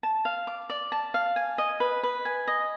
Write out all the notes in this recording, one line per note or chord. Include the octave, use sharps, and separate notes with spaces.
A5
F5
D6
D5
A5
F5
G#5
D#5
B4
B4
G#5
D#5